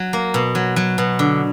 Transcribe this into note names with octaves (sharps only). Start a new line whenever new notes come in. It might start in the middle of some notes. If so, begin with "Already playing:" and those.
Already playing: F#3
A#3
B2
F#3
F#3
B2
D3